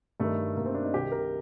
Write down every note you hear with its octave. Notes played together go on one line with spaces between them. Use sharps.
G2 D#3 A3
G2 D#3 A#3
C4
D4
D#4
C2 C3 D#3 G4
A#4